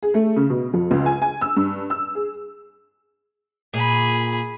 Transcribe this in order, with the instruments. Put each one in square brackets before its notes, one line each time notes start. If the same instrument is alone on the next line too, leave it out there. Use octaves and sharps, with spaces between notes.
[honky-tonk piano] G#4
A3
C#3
B2
F2
C#2
G#5
G#5
E6
G2
E6
G#4
[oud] A#2 [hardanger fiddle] G#4 B5